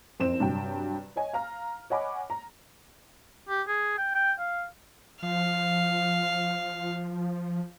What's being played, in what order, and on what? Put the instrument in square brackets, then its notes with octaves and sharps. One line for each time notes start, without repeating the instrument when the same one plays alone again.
[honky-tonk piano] F#1 F2 C4 C5 E7
G2 C3 F#3 G5
C#5 D#5 G#5
F5 A#5 F6
C#5 D#5 F#5 G#5 B5 D6
A#5
[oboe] G4
G#4
G5
G5
F5
[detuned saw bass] F3 [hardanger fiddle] F5